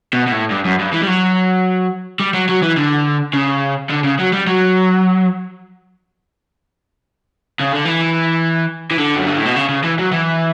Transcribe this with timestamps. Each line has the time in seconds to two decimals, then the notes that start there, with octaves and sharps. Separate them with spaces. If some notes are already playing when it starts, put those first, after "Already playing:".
0.13 B2
0.27 B2
0.32 A2
0.51 G2
0.65 F#2
0.79 G2
0.93 E3
1.02 G3
1.07 F#3
2.20 G3
2.34 F#3
2.49 F#3
2.62 E3
2.77 D3
3.33 C#3
3.90 D3
4.04 C#3
4.19 F#3
4.33 G3
4.47 F#3
7.60 C#3
7.73 D3
7.86 E3
8.91 E3
8.99 D3
9.16 F#2
9.26 G2
9.36 A2
9.45 B2
9.56 C#3
9.69 C#3
9.84 E3
9.99 F#3
10.12 E3